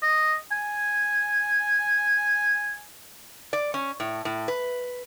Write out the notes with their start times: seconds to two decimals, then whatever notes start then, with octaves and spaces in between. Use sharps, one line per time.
0.03 D#5
0.52 G#5
3.53 D5
3.74 C#4
4.00 A2
4.25 A2
4.48 B4